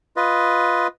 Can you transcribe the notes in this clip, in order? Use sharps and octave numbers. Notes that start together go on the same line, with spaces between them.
F4 B4 D#5